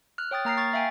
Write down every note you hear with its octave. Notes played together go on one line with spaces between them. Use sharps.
F6 F#6
C#5 G5 D#6 A6
A#3 A#5 F6 C7
C#6 A6
E5 F5 G5 G#5